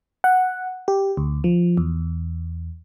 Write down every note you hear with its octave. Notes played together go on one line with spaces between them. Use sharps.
F#5
G4
D2
F3
E2